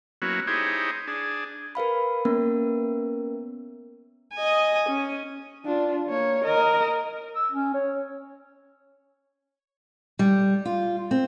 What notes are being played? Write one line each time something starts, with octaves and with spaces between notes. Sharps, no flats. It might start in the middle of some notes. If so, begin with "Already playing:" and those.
F#3 A#3 B3 C#4 E4 F#4
D#4 E4 G4 G#4 C5 C#5
D4 G#4
A#4 B4 F5 B5
A#3 B3 C#4 A#4
D#5 G#5
C#4
D4 F4
A#3 C#5
A#4 D#5
E6
C#4
C#5
G3
F4
C4